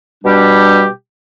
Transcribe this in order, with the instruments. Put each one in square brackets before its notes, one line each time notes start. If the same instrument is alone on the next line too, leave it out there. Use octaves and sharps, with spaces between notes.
[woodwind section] B2 G3 D4 G4